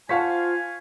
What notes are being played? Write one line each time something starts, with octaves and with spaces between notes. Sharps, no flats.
F4 C5 F5 F#5 G#5 A5 C#6 B6